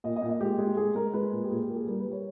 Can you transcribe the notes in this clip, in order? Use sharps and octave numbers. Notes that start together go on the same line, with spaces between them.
A#2 D#5
D#5
A#2
D#5
G#3 G4
G#3
G#3 G#4
G#3 A#4
G#3 B4
A#2
G4
A#2 G#4
G4
A#3
G#4
G3 A#4
B4
G3
C#5